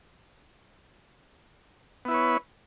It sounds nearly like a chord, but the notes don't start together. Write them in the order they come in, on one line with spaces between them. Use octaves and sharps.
B3 E4 B4 C#5